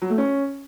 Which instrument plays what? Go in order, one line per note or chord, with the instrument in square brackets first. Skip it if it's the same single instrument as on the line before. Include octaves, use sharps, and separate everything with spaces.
[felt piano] F#3
A3
C#4